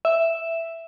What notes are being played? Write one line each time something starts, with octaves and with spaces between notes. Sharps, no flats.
E5